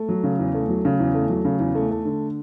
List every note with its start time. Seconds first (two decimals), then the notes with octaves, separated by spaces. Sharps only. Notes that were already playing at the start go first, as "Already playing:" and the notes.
Already playing: A3
0.09 F#3
0.23 C#3
0.39 E2
0.54 A3
0.69 F#3
0.85 C#3
0.99 E2
1.15 A3
1.30 F#3
1.45 C#3
1.60 E2
1.75 A3
1.91 A3
2.05 D3